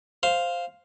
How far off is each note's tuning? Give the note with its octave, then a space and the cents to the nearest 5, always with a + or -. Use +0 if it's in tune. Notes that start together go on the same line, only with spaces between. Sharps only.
C5 +0 F5 +0